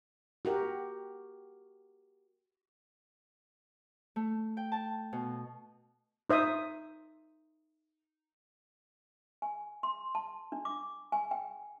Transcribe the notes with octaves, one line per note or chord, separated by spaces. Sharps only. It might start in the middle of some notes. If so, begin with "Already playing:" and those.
F#4 G4 A#4
A3
G5
A5
B2
D#4 C5 E5 D#6
G#5
C6
A5
D4
D6
G#5
G5